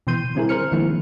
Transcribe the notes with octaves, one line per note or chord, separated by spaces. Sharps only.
B2 E3 B3 C6 G6 D#7
D3 G3 C4 E4 G#4 A#4
A#4 C5 F6 C#7
D3 D#3 F3 G#3 A#3 E4